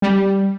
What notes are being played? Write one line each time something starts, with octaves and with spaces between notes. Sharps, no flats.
G3